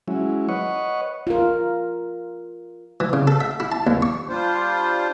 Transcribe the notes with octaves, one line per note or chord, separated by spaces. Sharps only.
F#3 G#3 C#4 E4
B4 C#5 D#5 F#5 C#6
F4 A#4
E3
C#3
A4
E5
E4
A5
D#2
C#6
G3 D4 F4 C5